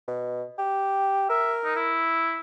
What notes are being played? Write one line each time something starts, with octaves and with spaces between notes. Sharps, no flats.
B2
G4
A#4 E5
D#4
E4